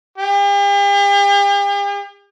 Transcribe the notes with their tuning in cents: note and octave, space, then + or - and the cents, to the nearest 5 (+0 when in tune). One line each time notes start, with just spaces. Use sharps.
G4 +45